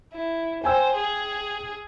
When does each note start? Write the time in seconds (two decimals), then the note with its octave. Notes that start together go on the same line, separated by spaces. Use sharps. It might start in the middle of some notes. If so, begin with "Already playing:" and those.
0.13 E4
0.64 C5 G5 G#5 E6
0.96 G#4